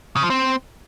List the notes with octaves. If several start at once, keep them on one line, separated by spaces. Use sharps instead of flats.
C#3
F3
C4